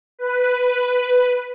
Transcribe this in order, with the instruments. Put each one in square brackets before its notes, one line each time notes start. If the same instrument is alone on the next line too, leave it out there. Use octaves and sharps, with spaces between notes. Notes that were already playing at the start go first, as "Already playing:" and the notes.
[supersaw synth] B4